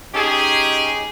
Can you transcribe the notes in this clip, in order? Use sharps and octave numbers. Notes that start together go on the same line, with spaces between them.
C#4 D#4 G4 G#4